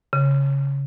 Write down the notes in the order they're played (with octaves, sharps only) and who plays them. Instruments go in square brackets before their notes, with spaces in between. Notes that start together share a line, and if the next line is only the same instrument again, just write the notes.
[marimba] C#3